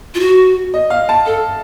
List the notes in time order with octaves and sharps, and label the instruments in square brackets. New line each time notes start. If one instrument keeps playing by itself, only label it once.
[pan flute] F4
F#4
[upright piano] D#5
F5
A5
[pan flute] A4